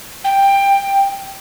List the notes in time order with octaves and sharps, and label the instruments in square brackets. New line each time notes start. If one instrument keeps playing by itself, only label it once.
[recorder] G5